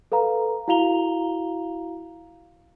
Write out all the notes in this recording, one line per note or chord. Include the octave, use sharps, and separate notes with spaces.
A4 B4 F5 A#5
E4 F#4 F5 A#5 F7 G7